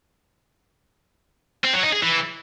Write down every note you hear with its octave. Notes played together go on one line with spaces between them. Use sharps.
C4
F#3
D#4
G#4
E3